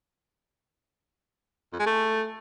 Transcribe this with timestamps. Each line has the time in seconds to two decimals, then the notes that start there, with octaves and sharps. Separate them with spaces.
1.73 F2
1.79 G#3
1.86 A3